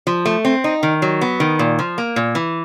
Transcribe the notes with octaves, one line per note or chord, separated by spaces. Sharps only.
F3
A3
C4
D#4
D#3
F#3
B3
D#3
A#2
F3
A#3
A#2
E3